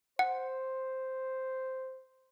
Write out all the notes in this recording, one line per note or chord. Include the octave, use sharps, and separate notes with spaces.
C5 F#5